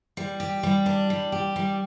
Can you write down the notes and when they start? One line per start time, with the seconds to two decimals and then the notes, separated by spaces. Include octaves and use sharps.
0.17 G3
0.40 G4
0.63 G3
0.86 D4
1.10 G3
1.32 G4
1.56 G3